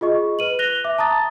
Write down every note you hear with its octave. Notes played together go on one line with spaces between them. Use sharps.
F4 G#4 D#5 C#6
B4 D#7 F#7
F#6 A#6 F7 G7
E5 D6
A5 A#5 D#6 A6